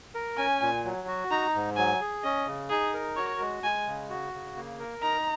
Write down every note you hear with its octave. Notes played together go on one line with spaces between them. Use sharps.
A#4
C#4 G#5
A#2
F#3
F#4
D#4 A#5
G#2
F#3 G#5
G#4
C#4 D#5
C#3
D#4 G#4
A#4
F#4 C#5
G#3
G#3 G#5
C#3
F#4
C#3
A#3
A#4
D#4 A#5